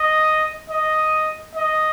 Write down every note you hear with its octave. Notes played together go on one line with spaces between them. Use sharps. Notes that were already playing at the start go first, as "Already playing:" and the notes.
Already playing: D#5
D#5
D#5